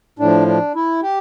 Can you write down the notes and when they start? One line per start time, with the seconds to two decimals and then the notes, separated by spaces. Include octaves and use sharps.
0.19 A2 F3 D4
0.47 D4
0.75 E4
1.03 G4